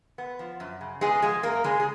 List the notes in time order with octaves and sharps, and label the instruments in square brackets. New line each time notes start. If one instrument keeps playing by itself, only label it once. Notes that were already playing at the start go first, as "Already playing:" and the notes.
[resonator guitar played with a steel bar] B3
F3
F#2
C#3
G#3 B3 G#4
F3 G#3 G#4
F#2 A#3 A#4
C#3 G#3 G#4
G#4